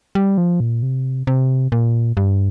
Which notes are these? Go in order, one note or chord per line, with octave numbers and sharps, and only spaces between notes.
G3
F3
A#2
C3
C3
A#2
G2